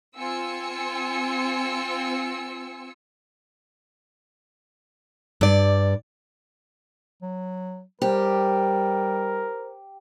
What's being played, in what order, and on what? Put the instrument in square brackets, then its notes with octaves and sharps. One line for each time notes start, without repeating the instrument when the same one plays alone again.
[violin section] C4 F4 G#5 E6 C#7
[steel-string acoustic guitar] G2 D5
[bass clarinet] F#3
[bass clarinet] G3 [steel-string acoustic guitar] G4 [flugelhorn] A#4 [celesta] C5